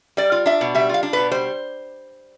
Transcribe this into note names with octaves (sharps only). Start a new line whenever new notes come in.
G3 D5
F4
D4 E5
B2
G3 E5
F4 F5
D4
B2 B4
G3 C5